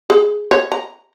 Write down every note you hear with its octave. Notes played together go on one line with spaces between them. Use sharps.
G#4
C#5
A#5